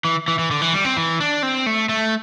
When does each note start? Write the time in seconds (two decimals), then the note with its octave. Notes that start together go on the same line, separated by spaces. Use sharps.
0.05 E3
0.28 E3
0.39 E3
0.51 D3
0.62 E3
0.74 G3
0.85 C4
0.97 E3
1.20 D4
1.43 C4
1.66 A3
1.89 A3